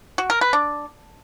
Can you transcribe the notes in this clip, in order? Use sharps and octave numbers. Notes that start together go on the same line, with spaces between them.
F#4
A#4
B4
D4